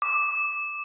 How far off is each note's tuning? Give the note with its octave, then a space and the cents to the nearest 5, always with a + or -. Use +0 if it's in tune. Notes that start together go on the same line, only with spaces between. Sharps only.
D6 +5